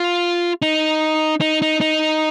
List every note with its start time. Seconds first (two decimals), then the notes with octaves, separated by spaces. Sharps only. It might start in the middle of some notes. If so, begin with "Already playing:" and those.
Already playing: F4
0.62 D#4
1.41 D#4
1.62 D#4
1.81 D#4